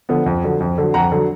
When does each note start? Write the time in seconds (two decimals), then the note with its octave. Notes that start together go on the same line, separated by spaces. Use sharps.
0.09 D3 F3 B3
0.26 F2
0.44 D3 F#3
0.60 F2
0.78 D3 F#3
0.94 F2 F#5 A#5
1.12 D3 F#3